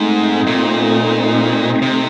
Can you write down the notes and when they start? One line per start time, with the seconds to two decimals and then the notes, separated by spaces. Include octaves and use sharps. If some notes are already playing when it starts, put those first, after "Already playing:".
Already playing: G#2 A3 C4 D#4
0.47 A#2
1.82 C3